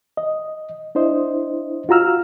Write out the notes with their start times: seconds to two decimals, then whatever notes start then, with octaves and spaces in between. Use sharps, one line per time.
0.17 D#5
0.95 D4 E4 C5 D#5
1.89 F4 F#4 A#5 E6 F6